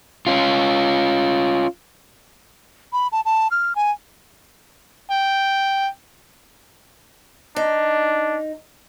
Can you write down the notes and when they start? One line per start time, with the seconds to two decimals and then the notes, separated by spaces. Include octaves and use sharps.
0.27 C#4 F4
2.93 B5
3.12 A5
3.25 A5
3.51 F6
3.75 G#5
5.11 G5
7.56 D4 D#4